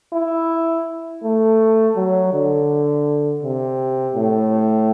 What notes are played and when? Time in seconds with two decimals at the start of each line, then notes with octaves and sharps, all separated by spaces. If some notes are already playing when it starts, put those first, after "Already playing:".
0.13 E4
1.23 A3
1.96 F#3
2.33 D3
3.43 C3
4.15 A2